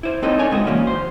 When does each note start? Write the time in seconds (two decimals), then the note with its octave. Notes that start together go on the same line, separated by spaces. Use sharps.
0.03 E4 C5
0.23 C4 D#4 A4 C#5 D#5
0.39 D4 D#4 A#4 C#5 G#5
0.51 C#3 G#3 E4 F#4
0.67 A#2 E3 F#3 A#3 C#4
0.87 C5